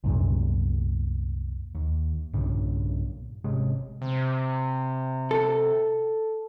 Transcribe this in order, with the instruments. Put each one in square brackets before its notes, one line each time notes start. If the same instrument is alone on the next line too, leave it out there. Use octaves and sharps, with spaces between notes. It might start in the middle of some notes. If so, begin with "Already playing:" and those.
[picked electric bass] C2 F#2 A#2
D#2
B1 G2 A#2 C#3
G#1 C3 G#3 C#4
[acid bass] C3
[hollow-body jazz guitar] A4